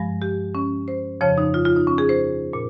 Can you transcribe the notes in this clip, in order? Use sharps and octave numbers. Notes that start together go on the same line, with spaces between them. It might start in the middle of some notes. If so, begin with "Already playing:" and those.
Already playing: G2 F3 G#3
G4
C#4
C5
F2 C#3 F3 C#5
D#4
F4
F4
D#4
C#4
G#4
C5
A#2